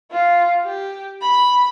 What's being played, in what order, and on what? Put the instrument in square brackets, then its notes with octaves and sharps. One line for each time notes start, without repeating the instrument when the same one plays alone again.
[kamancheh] F4
G4
B5